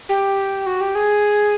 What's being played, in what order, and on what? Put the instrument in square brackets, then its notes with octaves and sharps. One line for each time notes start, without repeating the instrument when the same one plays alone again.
[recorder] G4
F#4
G4
G#4